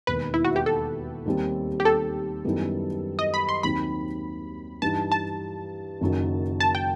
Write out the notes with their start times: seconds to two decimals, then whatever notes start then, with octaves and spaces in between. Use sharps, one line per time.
0.07 E1 D#2 D#3 B4
0.34 E4
0.45 F#4
0.56 G4
0.66 A4
1.26 D#2 D#3 G3 C4
1.80 G4
1.85 A4
2.45 F#2 D#3 G3 B3 E4
3.19 D#5
3.34 B5
3.49 C6
3.63 D#2 D#3 F#3 C4 D#4 B5
4.82 G2 E3 G3 D#4 A5
5.12 A5
6.01 F#1 F#2 D#3 F#3
6.60 A5
6.75 G5